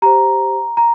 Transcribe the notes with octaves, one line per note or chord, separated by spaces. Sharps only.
G4 C5 A#5
A#5